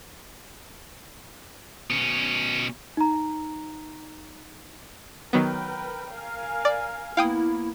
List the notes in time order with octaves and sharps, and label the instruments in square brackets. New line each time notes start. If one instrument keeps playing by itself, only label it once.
[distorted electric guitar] B2 C#4
[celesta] D#4 A#5
[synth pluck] D#3 F#3 B3 [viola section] A#4 B4 G5
[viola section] A#4 F5 G#5
[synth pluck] D5
[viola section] A#3 B3 [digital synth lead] E4 [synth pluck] F5 G5 D#6